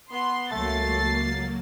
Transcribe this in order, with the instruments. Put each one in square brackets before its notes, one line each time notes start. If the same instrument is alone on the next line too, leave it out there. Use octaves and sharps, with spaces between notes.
[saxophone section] B3 [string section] C6
[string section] C#2 A6 C7 [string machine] F#3 A#3 [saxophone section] A3